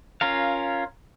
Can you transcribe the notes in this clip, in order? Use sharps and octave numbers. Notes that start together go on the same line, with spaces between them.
C#4 F4 A#4 F5